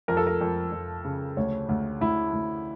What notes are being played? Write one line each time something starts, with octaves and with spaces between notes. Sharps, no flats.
F2 A#4
A4
A#4
F2
F2
C#3
D2 C#5
D2
D2 E4
D2